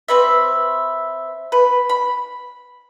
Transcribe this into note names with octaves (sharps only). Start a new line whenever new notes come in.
C4 B4 E5
B4
B5